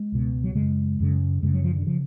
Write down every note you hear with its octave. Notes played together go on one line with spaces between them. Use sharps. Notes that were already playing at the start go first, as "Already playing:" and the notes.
Already playing: G#3
C#2 B2
F#3
F#2 C#3 G#3
F#2 C#3
F#2 C#3 G#3
F#3
F3
D3
C#3 F3